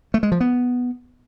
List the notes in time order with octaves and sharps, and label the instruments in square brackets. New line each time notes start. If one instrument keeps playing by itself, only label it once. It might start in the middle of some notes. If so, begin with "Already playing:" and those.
[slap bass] A3
G#3
F3
B3